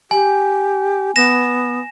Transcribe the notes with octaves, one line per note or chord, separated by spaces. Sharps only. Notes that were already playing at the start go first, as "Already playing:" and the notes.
G4 G#5
B3 A#6 E7